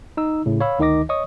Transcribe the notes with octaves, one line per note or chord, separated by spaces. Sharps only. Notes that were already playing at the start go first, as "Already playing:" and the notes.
D#4 E6
A2 C#3
C#5 F5 B5 E6
D2 D#3 D#4 D#5 D6 A#6
C#5 D#5 C#6 D#6